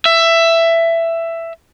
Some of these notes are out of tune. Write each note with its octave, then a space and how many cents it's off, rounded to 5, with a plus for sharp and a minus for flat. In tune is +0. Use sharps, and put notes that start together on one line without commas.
E5 +10